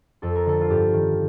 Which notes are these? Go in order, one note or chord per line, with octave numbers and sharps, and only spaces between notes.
F2 A4
A#4
D3 A4
F4
G2 G4
D#3